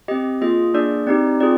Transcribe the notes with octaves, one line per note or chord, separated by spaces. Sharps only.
C4 G4 D#5
A#3 F4 G#4 D#5
A#3 D4 G#4 D5
C4 D#4 G4 D5
C4 F4 G#4 D5